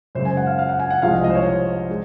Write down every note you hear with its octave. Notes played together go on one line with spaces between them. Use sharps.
F#2 C#3 G#3 C5
G#5
F#5
F5
F5
F#5
G#5
F#5
C2 C3 F3 G#3 F5
D#5
D#5
C5
C#5
C5
G#3